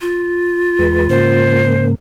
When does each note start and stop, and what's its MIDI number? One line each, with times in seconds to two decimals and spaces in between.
0.01 1.62 65
0.79 1.08 40
0.79 1.08 56
0.79 1.08 71
1.10 1.95 44
1.10 1.95 49
1.10 1.95 58
1.10 1.86 72